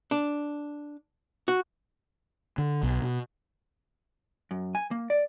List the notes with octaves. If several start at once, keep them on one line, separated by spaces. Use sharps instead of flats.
D4
F#4
D3
B1
B2
F#2
G#5
A#3
D5